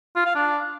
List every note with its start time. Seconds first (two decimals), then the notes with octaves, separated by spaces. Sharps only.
0.16 F4
0.25 F5
0.35 D4